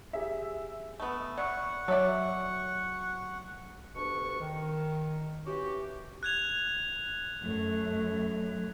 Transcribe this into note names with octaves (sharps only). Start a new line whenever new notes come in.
G4 G#4 E5
A3 B3
F#3 D5 F#5 C#6
F#3 A4 C#5 D5 E5
D2 B2 D4 G4 C#6
D#3
E3 C#4 F#4 G4
F#6 G#6 F7
F#2 A3